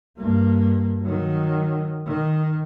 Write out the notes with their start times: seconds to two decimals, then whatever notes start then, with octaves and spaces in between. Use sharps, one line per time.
0.18 G2 A#3
1.01 D#3 F#3
2.06 D#3